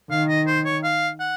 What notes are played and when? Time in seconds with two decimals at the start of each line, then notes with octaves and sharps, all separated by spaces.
0.10 D#3 F5
0.29 D#5
0.47 C5
0.65 C#5
0.83 F5
1.19 F#5